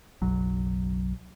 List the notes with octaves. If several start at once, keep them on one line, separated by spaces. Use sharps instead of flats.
F#1 B1 F#3